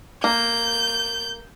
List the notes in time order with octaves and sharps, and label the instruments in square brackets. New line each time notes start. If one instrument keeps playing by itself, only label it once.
[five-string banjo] A#3 [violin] G6